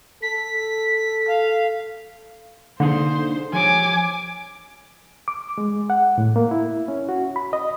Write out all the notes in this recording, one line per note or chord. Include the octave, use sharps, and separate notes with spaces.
A4 B6
F5
D3 A#3 D#4 G#4 C5
F3 G4 C#5 G#5 D6
D6
G#3
F#5
A2
A#3
E4
C#4
F#4
B5
D#5